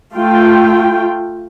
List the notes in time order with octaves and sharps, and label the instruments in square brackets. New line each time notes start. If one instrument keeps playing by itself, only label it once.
[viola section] A3 F4 G5